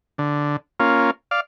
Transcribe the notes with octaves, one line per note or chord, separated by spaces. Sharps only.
D3
A#3 C#4 F4
D5 F5